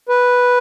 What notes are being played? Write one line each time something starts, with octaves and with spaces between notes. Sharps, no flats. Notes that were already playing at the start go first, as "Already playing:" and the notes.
B4